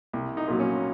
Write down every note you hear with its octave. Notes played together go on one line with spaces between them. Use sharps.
C2
D#4
A#2 F#3
C#4